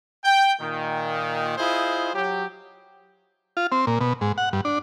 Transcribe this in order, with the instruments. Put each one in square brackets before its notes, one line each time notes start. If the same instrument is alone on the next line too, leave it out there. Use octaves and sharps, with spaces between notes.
[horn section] G5
A#2 D#3
E4 F4 G#4 C5 D#5
F#3 G4
[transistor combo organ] F4
C4
A#2
B2
G#2
F#5
G2
D4